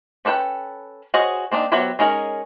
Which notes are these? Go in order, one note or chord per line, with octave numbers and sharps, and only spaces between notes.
C#4 D4 A4 B4 G5
F#4 G#4 C5 C#5 D#5
A#3 C4 D4 D#4
F#3 B3 G4 C5 E5
G#3 C#4 D#4 G#4 A#4